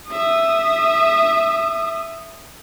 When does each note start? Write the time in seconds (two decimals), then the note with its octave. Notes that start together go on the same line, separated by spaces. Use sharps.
0.10 E5 D#6